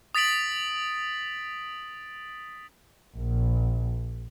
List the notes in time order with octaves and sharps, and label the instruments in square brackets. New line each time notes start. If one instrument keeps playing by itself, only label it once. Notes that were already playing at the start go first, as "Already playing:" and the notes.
[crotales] D#6 A6 B6 D7 F#7
[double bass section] A#1